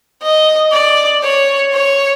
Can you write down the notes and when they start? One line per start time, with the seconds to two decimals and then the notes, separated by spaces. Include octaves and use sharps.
0.22 D#5
0.72 D5
1.23 C#5
1.73 C#5